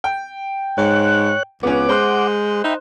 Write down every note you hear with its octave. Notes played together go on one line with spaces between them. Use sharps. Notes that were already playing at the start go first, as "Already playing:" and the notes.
G5
G#2 C#5 F#6
C#2 B3 C#4 F#5 D6
G#3 C5 C6 F#6
D#4 E5 G5 B5